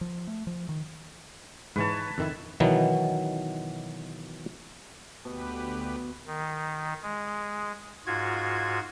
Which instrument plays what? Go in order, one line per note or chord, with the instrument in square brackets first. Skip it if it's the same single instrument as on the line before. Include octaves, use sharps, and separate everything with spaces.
[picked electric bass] F3
A3
F3
D#3
[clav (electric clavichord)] G#2 E3 [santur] B4 C#5 A5
[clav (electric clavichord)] F2 D#3 E4
B2 D#3 E3 F#3 B3
[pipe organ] D2 G4 B4 [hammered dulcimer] B2
[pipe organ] D#3
G#3
G#2 F4 F#4 G#6